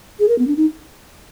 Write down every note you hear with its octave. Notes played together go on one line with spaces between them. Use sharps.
G#4
A#4
B3
D4
D#4